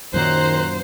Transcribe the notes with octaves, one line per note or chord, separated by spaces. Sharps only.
F#2 A#2 D#3 F#3 C5 A#5 F#6